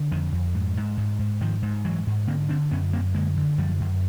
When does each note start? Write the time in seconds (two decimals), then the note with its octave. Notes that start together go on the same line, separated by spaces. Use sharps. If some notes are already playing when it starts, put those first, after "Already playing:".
Already playing: D3
0.12 F2 D#3
0.32 F2
0.55 G#2
0.77 G#2
0.97 G#2
1.19 G#2
1.40 G#2 D#3 F3
1.62 G#2
1.85 G#2 E3 F#3
2.07 G#2
2.27 D3 A#3 C4
2.49 D3 C4 D4
2.71 F#2 B3 C#4
2.93 F#2 A#3 C4
3.14 D3 G#3 A#3
3.36 D3
3.58 F#2 F3 G3
3.80 F#2